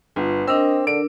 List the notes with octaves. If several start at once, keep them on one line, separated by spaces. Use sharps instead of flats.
G1 B3 F4
C4 D4 A#4 D#5 E6
D3 D7